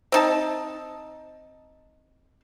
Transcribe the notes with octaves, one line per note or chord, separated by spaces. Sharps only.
C4 D#4 A5